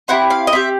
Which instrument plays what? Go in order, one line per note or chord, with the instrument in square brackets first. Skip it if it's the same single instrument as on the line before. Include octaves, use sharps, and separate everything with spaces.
[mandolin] C4 E4 G4 F#5
F5
D#5
C4 E4 G4 E5